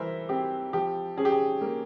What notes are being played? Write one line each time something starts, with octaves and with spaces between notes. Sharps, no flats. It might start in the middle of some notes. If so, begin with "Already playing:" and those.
Already playing: E3 G3 A#4 C5 E5
C4 G4
F3 G4
C#4 G#4
G4
G#4
A#3